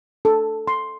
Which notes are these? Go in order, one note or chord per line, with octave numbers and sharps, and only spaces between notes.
A4
C6